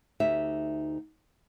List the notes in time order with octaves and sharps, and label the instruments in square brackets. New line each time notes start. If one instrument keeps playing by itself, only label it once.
[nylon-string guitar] D2 D#4 G4 E5